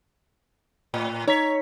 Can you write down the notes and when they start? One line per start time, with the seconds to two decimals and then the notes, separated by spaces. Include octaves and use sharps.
0.94 A2
1.27 D#4 C#5 A#5 B6